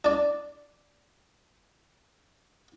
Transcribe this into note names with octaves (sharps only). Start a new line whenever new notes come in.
D4 D5